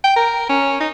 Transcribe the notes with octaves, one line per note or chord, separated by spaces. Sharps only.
G5
A#4
C#4
D#4